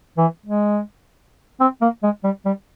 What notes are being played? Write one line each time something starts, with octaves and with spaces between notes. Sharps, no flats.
E3
G#3
C4
A#3
G#3
G3
G3